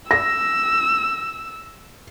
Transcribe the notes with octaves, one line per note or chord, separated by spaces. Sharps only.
E6 A#6